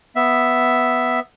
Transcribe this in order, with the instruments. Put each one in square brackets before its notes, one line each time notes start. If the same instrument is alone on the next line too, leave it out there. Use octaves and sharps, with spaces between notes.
[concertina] B3 E5